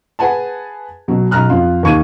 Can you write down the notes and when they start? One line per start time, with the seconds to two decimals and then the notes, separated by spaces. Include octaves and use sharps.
0.19 G#4 B4 F#5 G#5 A5
1.08 B2 F#3
1.31 B1 A#5 F6 F#6
1.50 F2 F4
1.83 D#2 G4 C#6 G#6 D#7